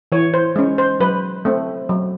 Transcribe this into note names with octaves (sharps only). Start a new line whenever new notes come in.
E3 C#5
C5
G#3 C#4
C5
F#3 B4
A3 C4
F#3